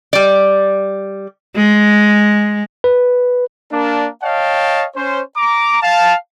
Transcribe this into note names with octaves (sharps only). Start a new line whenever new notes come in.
G3 D5
G#3
B4
A#3 D4
C#5 D#5 F5 G5 A5
C#4 C5
A#5 D6
F5 A5